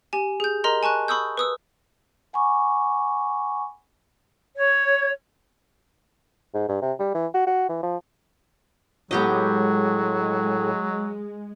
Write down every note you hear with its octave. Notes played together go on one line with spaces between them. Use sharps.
G4 G#5
G#4 G6
A#4 D#5 A#5 C6
G#5 A5 C#6 F#6
B5 C#6 D#6 E6 G6
B4 D#6 E6
F#5 G#5 B5 C#6 D6
C#5
G#2
G2
C3
G3
E3
F#4
F#4
E3
F3
A2 F#3 G#3 B3 G4 D#5